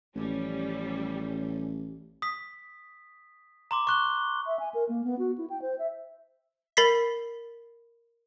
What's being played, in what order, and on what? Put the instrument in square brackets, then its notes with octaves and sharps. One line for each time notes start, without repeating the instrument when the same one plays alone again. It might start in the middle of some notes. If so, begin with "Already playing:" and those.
[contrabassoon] A1 [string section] F3 G3 C#4
[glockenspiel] D#6 B6
A#5 C6 D6
C#6 F#6 G7
[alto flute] E5
G#5
A#4
A#3
B3
F#4
E4
G5
C5
E5
[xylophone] A#4 B5 A6 B6 C7